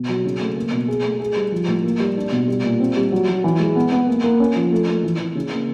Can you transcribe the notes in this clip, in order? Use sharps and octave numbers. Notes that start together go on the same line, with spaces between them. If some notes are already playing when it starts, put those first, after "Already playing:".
Already playing: B2
F#3
C#3
A3
A#3
B2
G#4
A3
G#4
G3
F3
A2
A#3
G3
D4
B2
G3
A#2
C4
G3
F#3
F#3
E3
G#3
B3
B3
A#3
A#3
C#4
F3
A3
A3
E3
E3
C#3
A#3